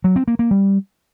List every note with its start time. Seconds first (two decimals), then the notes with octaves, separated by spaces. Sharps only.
0.04 F#3
0.16 C4
0.28 A#3
0.39 A#3
0.51 G3